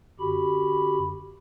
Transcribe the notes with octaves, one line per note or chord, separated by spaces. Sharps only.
F#2 D3 F#4 G4 B5